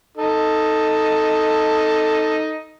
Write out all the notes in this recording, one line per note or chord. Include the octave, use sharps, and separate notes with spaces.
D#4 A4